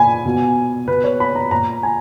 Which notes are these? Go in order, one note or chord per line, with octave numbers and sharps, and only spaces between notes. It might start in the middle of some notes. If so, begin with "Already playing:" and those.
Already playing: A#2 G#5 B5
B2
B2 B4
C#5
B5
A#5
A#2 A#5
G#5